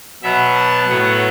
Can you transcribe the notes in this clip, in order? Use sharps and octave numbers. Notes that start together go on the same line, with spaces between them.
B2 F#3 B3 E5
A5
A2 F#3 B3 F#5